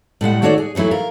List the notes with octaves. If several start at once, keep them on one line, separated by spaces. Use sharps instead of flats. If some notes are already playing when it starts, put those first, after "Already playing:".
A2 G3 G#3 F#5
D#3 A3 F#4 A4 C#5 D5
G#4
E2 E3 F#3 A3 E4
F4 A#4